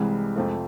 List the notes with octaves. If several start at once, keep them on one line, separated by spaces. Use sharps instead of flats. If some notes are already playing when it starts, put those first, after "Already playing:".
Already playing: C2 C3 E3 G3 G#3
F2 C3 F3 A3